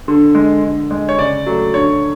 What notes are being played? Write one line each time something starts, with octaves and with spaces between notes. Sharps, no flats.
D3
G#3
D3
G#3
C#5
C#3 D5
F#3 A3
D3 C#5